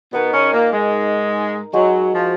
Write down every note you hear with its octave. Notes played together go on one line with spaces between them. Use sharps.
B2 B3 D#4 A#4 D#5
C#3 C#4
A#2 A#3
G#2 G#3
F#3 G#3 D#4 F#4
F3